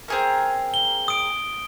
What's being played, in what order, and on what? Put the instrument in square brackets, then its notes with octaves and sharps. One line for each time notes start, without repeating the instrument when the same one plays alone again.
[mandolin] C4 G#4 A#4
[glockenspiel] G7
D#6 D7